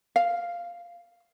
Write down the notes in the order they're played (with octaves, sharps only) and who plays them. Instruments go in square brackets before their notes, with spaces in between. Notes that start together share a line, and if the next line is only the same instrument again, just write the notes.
[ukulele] F5